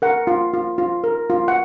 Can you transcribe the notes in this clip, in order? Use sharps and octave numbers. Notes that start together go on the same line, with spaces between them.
A#4 F#5
F4
F4
F4
A#4
F4
F#5